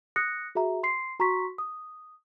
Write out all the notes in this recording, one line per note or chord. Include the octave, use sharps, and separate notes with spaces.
D#6 F#6 A#6 C#7
F#4 G#4 E5 A#5
C6 C7
F#4 A#5 C6 C#6 B6
D#6